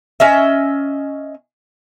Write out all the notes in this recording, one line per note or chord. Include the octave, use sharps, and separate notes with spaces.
C#4 D#5 E5